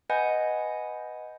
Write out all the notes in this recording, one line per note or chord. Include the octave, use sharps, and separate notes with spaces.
B4 D#5 F#5 G#5 B5 G6